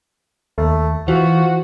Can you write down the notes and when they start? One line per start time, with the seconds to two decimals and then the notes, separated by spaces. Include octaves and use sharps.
0.58 D#2 A3
1.08 E3 F3 F#4